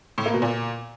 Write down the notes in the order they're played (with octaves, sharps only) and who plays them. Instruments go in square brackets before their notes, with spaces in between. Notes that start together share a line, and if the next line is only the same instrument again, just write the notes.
[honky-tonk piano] A2
A#3
B2
A#2